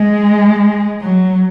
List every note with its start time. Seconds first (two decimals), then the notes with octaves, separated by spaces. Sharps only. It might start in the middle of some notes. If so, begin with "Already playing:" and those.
Already playing: G#3
1.01 F#3